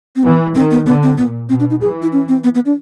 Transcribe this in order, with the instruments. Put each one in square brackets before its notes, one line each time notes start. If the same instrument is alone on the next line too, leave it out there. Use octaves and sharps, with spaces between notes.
[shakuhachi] C4
[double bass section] E3 [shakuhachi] B3
[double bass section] D#3 [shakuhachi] C4
[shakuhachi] B3
[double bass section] D3 [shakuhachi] B3
[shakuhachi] C4
[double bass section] A#2 [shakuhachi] B3
[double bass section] B2 [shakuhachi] C4
[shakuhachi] D4
D#4
[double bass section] E3 [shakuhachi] G#4
[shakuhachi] E4
C#4
C4
B3
B3
D4